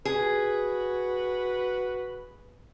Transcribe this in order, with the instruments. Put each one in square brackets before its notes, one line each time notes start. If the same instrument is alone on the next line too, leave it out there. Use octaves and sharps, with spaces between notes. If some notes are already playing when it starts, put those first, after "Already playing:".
[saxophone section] F#4 B4 [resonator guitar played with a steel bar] G#4